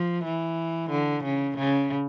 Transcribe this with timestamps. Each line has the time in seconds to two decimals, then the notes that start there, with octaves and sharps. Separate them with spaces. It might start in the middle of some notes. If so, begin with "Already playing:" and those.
Already playing: F3
0.24 E3
0.90 D3
1.24 C#3
1.58 C#3